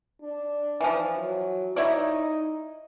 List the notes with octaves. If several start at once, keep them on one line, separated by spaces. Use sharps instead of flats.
D4
E3 F3
F#3
D#4 E4 C#5 D5